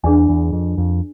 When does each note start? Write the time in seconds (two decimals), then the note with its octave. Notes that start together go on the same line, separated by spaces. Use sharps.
0.04 E2 D4 G#4 B4 D5 G#5
0.29 E2
0.53 F2
0.78 F2